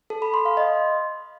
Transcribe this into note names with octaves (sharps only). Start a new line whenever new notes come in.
A4
B5
C6
F5
D#5